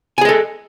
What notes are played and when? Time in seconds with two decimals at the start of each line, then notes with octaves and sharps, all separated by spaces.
0.18 G#5
0.21 G#4
0.25 D#5
0.29 A4